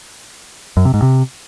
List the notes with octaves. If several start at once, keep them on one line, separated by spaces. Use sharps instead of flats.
F#2
C3
G#2
C3